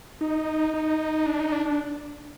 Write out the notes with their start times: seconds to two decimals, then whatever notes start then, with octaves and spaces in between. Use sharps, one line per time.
0.21 D#4
0.74 D#4
1.26 D4
1.40 D#4
1.52 D4
1.65 D4